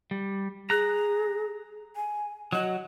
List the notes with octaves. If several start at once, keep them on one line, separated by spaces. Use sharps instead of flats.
G3
G#4 A#5 F#6
G#5
F#3 F#4 D#5